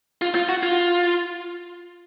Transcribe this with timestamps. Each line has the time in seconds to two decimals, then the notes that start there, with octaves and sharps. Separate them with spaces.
0.22 F4
0.35 F4
0.49 F#4
0.63 F4